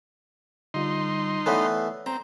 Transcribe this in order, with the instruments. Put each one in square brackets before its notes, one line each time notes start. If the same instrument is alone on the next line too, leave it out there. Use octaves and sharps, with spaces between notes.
[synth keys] D3 G3 F4 [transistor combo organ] D#4 C6
[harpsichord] E3 A3 B3 [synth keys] C#5 D5
[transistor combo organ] C4 [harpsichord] A#5